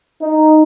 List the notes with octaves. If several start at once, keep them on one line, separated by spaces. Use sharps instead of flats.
D#4